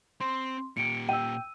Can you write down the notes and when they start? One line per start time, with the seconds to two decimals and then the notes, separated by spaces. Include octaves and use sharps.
0.21 C4 C6
0.77 A#2 G4 C#7 D7
1.09 G5 E6 D#7